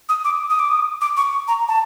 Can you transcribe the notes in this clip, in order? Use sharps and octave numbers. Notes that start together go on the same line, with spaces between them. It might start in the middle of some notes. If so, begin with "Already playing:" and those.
D#6
D6
D#6
D6
D#6
D6
C#6
A#5
A5